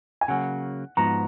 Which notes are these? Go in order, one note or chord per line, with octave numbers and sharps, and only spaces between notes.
G#5
C#3 F#3 A#3 F#5
G#2 F3 B3 F#4 A#5